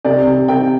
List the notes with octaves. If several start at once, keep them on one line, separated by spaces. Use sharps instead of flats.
C3 D5
C3
C3 G5